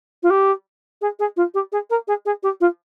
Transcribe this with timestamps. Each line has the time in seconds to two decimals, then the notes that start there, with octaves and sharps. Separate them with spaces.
0.23 F4
0.30 G4
1.01 G#4
1.19 G#4
1.36 F4
1.54 G4
1.72 G#4
1.90 A#4
2.07 G#4
2.25 G#4
2.43 G4
2.61 F4